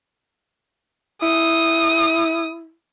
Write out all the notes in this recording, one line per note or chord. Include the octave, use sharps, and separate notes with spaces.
E4 D#6